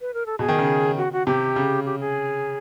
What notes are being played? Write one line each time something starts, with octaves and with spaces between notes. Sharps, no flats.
B4
A#4
A4
B2 G#4
D#3
C#3
F#4
F#4
C3 G4
C#3
G4
G#4